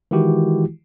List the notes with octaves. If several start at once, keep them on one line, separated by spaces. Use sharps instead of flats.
D#3 E3 G#3 E4 F#4 G4